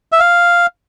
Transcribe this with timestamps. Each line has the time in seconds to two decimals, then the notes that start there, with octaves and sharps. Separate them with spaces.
0.12 E5
0.20 F5